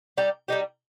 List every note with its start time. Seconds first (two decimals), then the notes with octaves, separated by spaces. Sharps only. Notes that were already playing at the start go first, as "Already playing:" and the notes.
0.17 G3 D#4 G4
0.48 G3 D#4 G4